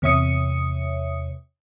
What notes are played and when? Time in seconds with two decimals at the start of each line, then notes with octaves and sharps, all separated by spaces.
0.02 E2 C3 C#5 E5 D#6 C#7